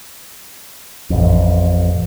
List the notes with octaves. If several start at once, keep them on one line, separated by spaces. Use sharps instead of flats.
A1 F2